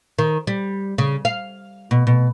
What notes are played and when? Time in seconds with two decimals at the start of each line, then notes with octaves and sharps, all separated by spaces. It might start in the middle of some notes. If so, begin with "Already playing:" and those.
0.19 D#3
0.47 G3
0.98 C#3
1.25 F5
1.91 B2
2.07 B2